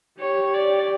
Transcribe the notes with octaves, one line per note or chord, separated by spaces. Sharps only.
G4 C#5
D5